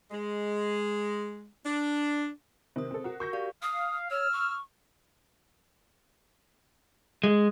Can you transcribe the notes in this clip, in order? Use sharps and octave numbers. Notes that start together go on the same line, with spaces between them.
G#3
D4
C3 D#3 C5 D#6
C4 A4
F#4 A#4 F#5
F#4 A#4 C#6 G6 A#6
G4 D5 F5
F5 D#6
C#5 E6 F6
C#6
G#3